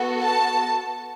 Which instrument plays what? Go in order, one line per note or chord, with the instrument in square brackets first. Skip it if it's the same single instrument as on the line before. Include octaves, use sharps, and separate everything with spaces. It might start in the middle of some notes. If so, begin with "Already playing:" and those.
Already playing: [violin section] B3 F#4 A4
A5